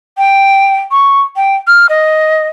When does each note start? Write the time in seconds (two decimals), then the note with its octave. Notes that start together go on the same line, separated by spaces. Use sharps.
0.18 G5
0.91 C#6
1.36 G5
1.67 F6
1.89 D#5